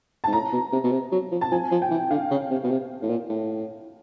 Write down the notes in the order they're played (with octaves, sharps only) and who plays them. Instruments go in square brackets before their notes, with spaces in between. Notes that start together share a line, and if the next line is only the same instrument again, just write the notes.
[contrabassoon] G#2 [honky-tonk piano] A5
[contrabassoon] A2 [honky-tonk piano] A#5
[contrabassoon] B2
C3
B2
C3
F#3
F3
[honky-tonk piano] A5
[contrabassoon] F3 [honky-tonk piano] G#5
[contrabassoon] F3
[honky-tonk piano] G5
[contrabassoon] E3
[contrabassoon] D3 [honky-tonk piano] F5
[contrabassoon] C#3
C3
B2
C3
A2
A#2
A2